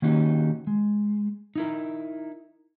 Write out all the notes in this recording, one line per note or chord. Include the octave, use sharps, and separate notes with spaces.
D#3 A#3 C#4 D#4 F#4 G4
G#3
D#4 E4 A#4